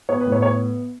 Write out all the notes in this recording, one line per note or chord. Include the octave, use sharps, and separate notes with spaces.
B3 C#5
B4
A2
C#5
B3 C#5